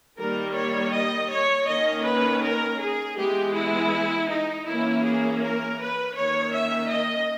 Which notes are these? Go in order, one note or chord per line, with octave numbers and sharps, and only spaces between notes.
D#3 G3 A#3 A#4
C#5
D#5
C#5
D#3 A#3 C#4 D#5
B4
A#4
G#4
E3 G#3 B3 G4
E4
D#4
E3 A#3 C#4 E4
G#4
A#4
B4
D#3 A#3 C#4 C#5
E5
D#5